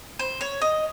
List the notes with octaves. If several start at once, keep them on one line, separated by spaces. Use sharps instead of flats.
C5
C#5
D#5